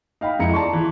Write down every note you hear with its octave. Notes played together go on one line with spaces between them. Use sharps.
D#4 F5 G5 B5
F2 G#3 E4 A#5 C#7
D5 A5 A#5 C6 C#6
E3